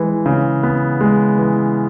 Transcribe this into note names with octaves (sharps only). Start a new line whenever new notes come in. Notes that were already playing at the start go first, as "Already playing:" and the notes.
Already playing: E3 G#3
C#3
B3
G#3
E3